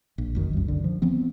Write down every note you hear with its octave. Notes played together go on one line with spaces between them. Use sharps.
A#1
F1 F#2 C3 D#3
C2 F#2
D3
F3
F3 B3 C4